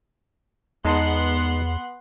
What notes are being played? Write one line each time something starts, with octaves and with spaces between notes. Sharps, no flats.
E2 G#3 B3 D#4 F#5 A5 C6